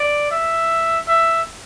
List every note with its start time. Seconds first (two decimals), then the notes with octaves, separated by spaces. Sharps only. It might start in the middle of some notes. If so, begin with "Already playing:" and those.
Already playing: D5
0.31 E5
1.08 E5